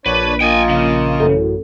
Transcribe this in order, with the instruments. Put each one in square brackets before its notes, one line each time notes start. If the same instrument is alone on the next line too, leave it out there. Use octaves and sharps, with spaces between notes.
[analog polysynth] A#1 [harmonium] D4 C#5 D5 [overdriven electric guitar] B4
[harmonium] A#3 F4 D#5 [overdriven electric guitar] G5 G#5
[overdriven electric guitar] C#3 [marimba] F5
[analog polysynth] A1 F#2 [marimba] A4